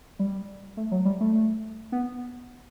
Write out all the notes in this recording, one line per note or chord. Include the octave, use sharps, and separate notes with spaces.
G3
A3
F#3
G3
A3
B3